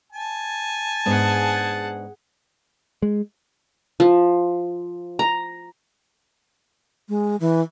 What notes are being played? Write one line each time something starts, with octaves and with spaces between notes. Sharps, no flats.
G#5 A5
G#2 B3 D4 G#4 F#5
G#3
F3
A#5
G#3
E3